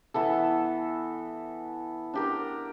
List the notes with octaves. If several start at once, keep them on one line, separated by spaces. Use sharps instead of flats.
E3 B3 A4
D4 G4 A#4